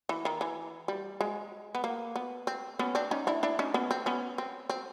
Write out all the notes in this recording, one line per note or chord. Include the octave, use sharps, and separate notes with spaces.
E3
D#3
E3
G3
G#3
B3
A#3
B3
C4
B3 C#4
C4 D4
C#4 D#4
D4 E4
D4 E4
C#4 D#4
B3 C#4
C4
B3 C#4
C4
C4